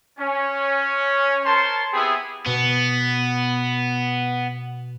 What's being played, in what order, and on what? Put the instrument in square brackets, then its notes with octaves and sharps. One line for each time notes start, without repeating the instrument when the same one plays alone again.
[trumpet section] C#4
A#4 C5 C#5 A5 C6
B3 C4 E4 G4 G#4 B5
[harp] B2 [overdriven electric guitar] B3